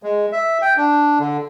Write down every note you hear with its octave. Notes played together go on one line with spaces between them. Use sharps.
G#3
E5
G5
D4
D3